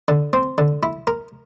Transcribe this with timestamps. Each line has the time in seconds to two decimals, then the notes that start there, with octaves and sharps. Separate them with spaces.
0.08 D3
0.33 C4
0.58 D3
0.83 E4
1.07 A#4